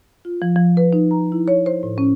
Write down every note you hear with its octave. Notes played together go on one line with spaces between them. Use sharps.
F4
F3
F3
B4
D#4
A#5
E4
C#5
C5
A2
C#4